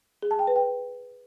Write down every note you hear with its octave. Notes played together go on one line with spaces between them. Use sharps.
G#4
A5
G5
B4
G5